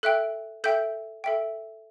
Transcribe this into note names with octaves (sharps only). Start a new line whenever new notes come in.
A4 E5 G5 F#6
A4 E5 G5 G6
A4 E5 G5